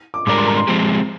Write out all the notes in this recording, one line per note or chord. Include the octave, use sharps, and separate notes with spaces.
D6
G#2 G3 D4 G4 A#4 D6
C6
A#5
C6
F3 G#3 C4 G4